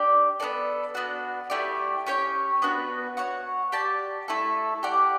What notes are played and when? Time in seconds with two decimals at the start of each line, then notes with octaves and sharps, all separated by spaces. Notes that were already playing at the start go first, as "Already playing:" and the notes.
Already playing: D4 G4 D5
0.40 B3 F#4 A4 D5
0.95 B3 D4 F#4
1.50 A3 E4 G4 D5
2.06 C#4 G4 C#5 G5
2.62 B3 D4 F#4 B4
3.17 F#4 C#5 F#5
3.72 G4 D5 A5
4.28 A3 E4 A4
4.83 G4 D5 F#5